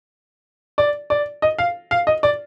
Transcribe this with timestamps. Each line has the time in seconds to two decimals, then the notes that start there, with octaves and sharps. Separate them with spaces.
0.78 D5
1.10 D5
1.42 D#5
1.58 F5
1.91 F5
2.07 D#5
2.23 D5